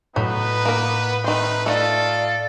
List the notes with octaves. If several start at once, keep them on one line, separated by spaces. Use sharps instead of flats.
A2 F#3 B3 D#4 B4 B6
A#3 A#4
D#3 A3 C4 D#4 B4
A3 D#4 F4 A4 D5